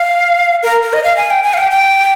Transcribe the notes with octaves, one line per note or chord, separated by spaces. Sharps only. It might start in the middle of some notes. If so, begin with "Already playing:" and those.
Already playing: F5
A#4
A#4
D#5
F5
G#5
G5
G#5
F5
G5
G5